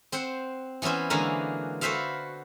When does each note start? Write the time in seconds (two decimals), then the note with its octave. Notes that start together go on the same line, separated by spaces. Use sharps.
0.12 C4 C5 F#5
0.82 E3 B3 C#4 E4 C5
1.10 D3 E3 G#3 A#3 F#4 A#4
1.81 F#4 A4 B4 C5 E5 F5